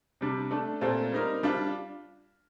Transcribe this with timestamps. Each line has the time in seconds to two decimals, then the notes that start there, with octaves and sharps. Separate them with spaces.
0.21 C3 G3 D4
0.51 A3 D4 A4
0.81 A#2 A3 C4 F4 A4
1.12 G3 C4 D#4 A#4
1.43 G3 D4 F4